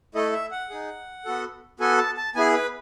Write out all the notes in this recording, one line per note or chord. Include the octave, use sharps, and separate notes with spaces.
A3 E4 A4 D#5
E5
F#5
D#4 G#4
B3 F#4 A4
B3 F#4 A4 G#5
A5
A5
B3 E4 G#4 G#5
B4